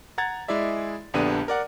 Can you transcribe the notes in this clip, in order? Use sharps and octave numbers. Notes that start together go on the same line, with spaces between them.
F#5 A#5 G#6 A6
G#3 E4 G#4 D5 E5
A#1 D3 B3 D4 G4 D#7
A#4 D5 F#5